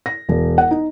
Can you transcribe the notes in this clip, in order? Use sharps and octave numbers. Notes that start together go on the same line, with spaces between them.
A#6
E1
F#5
D#4